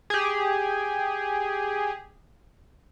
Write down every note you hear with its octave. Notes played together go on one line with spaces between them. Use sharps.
G4 G#4